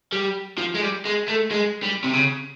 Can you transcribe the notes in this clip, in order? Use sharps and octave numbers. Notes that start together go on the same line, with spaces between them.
G3
F3
G#3
G3
G#3
A3
G#3
G3
C3
C#3